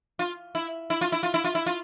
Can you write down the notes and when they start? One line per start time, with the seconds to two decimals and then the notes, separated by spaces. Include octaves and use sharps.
0.19 F4
0.55 E4
0.90 E4
1.01 F4
1.12 E4
1.23 F4
1.34 E4
1.44 F4
1.55 E4
1.66 F4